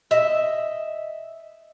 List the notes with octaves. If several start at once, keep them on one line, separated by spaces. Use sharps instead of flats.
D#5 E5